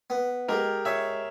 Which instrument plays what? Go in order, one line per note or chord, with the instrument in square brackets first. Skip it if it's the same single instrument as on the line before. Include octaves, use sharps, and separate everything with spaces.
[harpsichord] B3
[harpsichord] G#3 [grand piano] G4 A#4
[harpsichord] G#4 [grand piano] C#5 E5